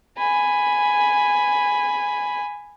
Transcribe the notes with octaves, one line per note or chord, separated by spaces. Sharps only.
G#5 B5